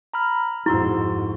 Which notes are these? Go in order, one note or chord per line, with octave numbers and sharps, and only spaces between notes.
A#5 B5 F6
F2 G#2 E4 F#4 C6 E6